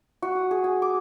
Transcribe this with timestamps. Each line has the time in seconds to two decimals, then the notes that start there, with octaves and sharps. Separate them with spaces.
0.22 F#4
0.35 D#6
0.51 G#4
0.64 G#5
0.82 D6